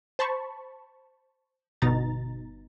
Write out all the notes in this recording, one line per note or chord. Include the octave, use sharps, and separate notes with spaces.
C5 A5 B5 C#6
G1 B2 D#4 A#5 A6